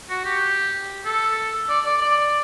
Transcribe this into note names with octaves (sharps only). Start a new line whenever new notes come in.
F#4
G4
A4
D5
D5
D5